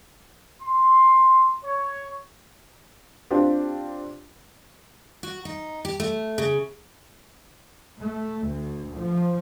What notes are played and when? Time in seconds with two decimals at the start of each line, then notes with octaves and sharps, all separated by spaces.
0.62 C6
1.64 C#5
3.31 C4 D4 F4 G4 D5
5.23 F#4
5.45 D#4
5.85 G4
6.00 A3
6.38 C#3
8.01 A3
8.48 D2
8.97 F3